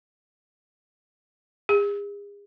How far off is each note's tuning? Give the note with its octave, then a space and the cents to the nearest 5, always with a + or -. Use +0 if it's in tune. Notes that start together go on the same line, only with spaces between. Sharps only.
G#4 -40